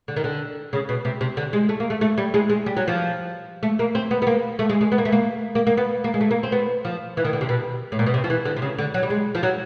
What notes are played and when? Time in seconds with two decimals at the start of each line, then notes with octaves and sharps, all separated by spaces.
0.08 D3
0.16 D#3
0.24 D3
0.73 C#3
0.89 B2
1.05 C3
1.21 C3
1.37 D3
1.53 G#3
1.69 A3
1.80 A#3
1.90 A3
2.01 A3
2.18 G3
2.34 G#3
2.50 G#3
2.66 G3
2.77 F#3
2.88 F3
3.63 A3
3.79 A#3
3.95 C4
4.11 B3
4.22 B3
4.27 A#3
4.59 A3
4.69 G#3
4.81 G#3
4.92 B3
4.98 A#3
5.05 A3
5.12 A#3
5.55 A#3
5.67 A#3
5.77 B3
6.04 A#3
6.14 G#3
6.21 A3
6.31 A#3
6.43 C4
6.52 B3
6.85 F3
7.17 E3
7.25 D#3
7.33 D3
7.41 C3
7.49 B2
7.92 A2
7.99 A#2
8.06 B2
8.14 C3
8.24 F3
8.30 E3
8.45 D3
8.56 C3
8.62 C#3
8.78 D3
8.94 F#3
9.03 G3
9.10 G#3
9.35 F3
9.43 F#3